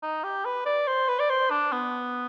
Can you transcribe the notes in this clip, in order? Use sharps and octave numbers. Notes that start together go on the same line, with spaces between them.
D#4
G4
B4
D5
C5
B4
D5
C5
D4
B3